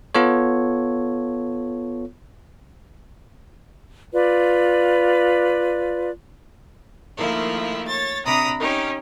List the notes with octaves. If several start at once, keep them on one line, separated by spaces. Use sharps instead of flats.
B3 F4 A4 C#5
F4 B4 D5
D#3 F3 A3 A#3 E4 F4
C#5 A6
C3 D4 A#5 B5 D#6
C#4 D#4 G4